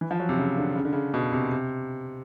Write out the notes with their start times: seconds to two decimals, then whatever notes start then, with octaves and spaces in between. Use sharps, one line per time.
0.01 E3
0.11 F3
0.20 F#3
0.29 C3
0.39 C#3
0.58 D3
0.76 C#3
0.85 D3
0.93 C#3
1.14 B2
1.32 C3
1.52 C3